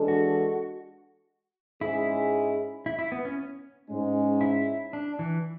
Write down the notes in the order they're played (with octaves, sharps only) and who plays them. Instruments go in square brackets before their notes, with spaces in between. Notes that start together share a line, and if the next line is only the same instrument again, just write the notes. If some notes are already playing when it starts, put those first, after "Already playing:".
Already playing: [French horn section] E3 G#3 D4 A4
[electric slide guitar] F#4
[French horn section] G#2 G#3 C#4 G#4 [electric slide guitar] E4
[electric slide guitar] E4
E4
B3
C#4
[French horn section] G#2 G#3 C#4
[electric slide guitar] E4
D4
E3